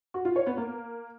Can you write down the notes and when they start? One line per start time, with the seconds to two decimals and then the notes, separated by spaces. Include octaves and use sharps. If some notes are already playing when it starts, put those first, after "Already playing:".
0.14 F#4
0.25 F4
0.36 C#5
0.46 B3
0.57 A#3